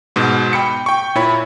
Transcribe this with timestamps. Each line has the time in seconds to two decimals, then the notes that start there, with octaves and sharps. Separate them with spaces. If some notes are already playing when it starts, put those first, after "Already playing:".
0.16 G#2 B2
0.53 G5 B5 C#7
0.86 G5 C#6
1.15 A#2 E4 C#5 B5